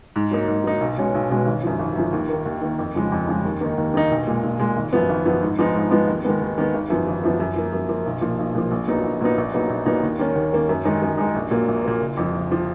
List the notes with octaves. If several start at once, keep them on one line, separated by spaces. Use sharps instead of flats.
G#2
F#3 A#3 D#4
G#2
F#3 A#3 D#4
B1
B2 G#3 C#4
B1
B2 G#3 C#4
G#1
F#2 F3
G#1
F#2 F3
D#2
D#3 A#3
D#2
D#3 A#3
F2
C#3 F3 G#3
F2
C#3 F3 G#3
D#2
D#3 A#3 D#4
D#2
D#3 A#3 D#4
B1
A#2 G#3
B1
A#2 G#3
G#1
F#2 F3 B3
G#1
F#2 F3 B3
G#2
F3 G#3 B3 D#4
G#2
F3 G#3 B3 D#4
D#2
D#3 G#3 B3
D#2
D#3 G#3 B3
G#1
F#2 F3 B3
G#1
F#2 F3 B3
F#2
F3 A#3
F#2
F3 A#3
B1
A#2 F3
B1
A#2 F3
A#1
A#2 F#3 B3 D#4
A#1
A#2 F#3 B3 D#4
A#1
A#2 F#3 B3 D#4
A#1
A#2 F#3 B3 D#4
D#2
D#3 A#3 C#4
D#2
D#3 A#3 C#4
F#2
D#3 G#3 D#4
F#2
D#3 G#3 D#4
A#1
A#2 F#3 A#3
A#1
A#2 F#3 A#3
F#1
F2 F3
F#1
F3